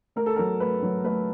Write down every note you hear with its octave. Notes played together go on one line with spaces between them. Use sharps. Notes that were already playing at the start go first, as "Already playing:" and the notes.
A3 A#4
A4
F#3 A#4
A3 B4
F#3
A3 B4